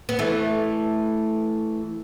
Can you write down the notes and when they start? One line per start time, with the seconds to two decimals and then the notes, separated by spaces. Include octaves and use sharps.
0.09 B3
0.19 E3 A3